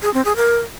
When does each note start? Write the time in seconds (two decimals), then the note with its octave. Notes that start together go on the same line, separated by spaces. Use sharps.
0.02 G#4
0.14 C4
0.25 G#4
0.36 A#4